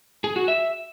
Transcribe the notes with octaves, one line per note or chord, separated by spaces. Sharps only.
G#4
F#4
E5